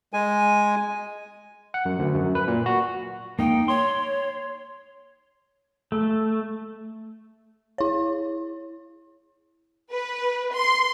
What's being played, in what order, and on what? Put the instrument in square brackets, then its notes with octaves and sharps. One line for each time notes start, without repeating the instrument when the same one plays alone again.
[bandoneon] G#3 G#5
[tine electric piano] F#5
F#2
D2
F#2
B4
A#2
F#4
[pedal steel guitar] A#3 D#4 [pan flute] G5
[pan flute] C#5 [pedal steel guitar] C6
[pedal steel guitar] A3
[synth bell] E4 C#5
[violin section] B4
C6